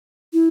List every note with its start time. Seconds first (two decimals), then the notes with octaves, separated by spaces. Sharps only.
0.33 E4